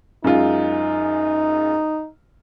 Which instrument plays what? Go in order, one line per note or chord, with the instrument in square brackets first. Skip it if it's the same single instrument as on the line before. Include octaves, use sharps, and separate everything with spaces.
[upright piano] F#2 G#3 F4 [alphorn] D#4